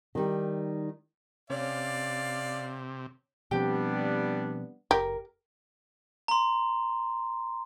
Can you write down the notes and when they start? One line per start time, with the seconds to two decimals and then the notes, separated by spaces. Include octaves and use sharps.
0.15 D#3 G3
1.50 C3 C#4 D5 F5
3.51 B2 F3 G3 B3 C4 D4 G4
4.91 F#1 G4 A#4
6.28 A#5 C6